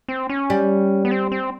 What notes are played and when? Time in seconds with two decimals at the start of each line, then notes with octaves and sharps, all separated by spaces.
0.09 C4
0.30 C#4
0.50 G3
1.05 B3
1.11 C4
1.32 C4